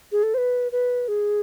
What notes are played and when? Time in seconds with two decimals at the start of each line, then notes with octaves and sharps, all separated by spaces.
0.12 G#4
0.23 A4
0.34 C5
0.38 B4
0.72 B4
1.08 G#4